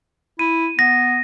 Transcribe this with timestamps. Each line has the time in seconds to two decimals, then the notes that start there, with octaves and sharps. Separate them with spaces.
0.39 E4 D#7
0.79 B3 A#6